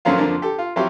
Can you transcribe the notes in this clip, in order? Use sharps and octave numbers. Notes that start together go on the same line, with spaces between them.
F#2 D3 F3 F#3 A#3 F4
F2 D3 F3 A#3 D4
G4 A4
F4
F3 F#3 C4 E4 F#4 G4